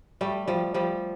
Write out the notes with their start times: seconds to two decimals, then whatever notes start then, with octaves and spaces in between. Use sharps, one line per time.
0.21 G3 A3
0.48 F3 G3
0.74 F3 G3